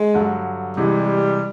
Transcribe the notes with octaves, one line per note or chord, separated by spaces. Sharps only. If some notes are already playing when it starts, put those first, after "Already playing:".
Already playing: G#3
G2 D3 F#3
C3 E3 G3 G#3